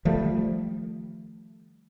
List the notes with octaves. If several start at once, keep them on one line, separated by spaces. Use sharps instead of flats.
D#3 F3 G3 A3